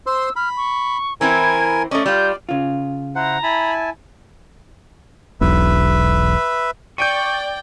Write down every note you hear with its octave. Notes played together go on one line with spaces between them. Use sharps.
C5 C6 E6
B5 F6
C#6
E3 C4 E4 A#4 G#5 G#6
A3 C#4 D5 D#5
G3 F4 G6
C#3 F4
E4 C5 F#5 A#5
E4 G#5 A5 B5
E1 B1 B4 E5
D5 G5 C#6 G6 D7 D#7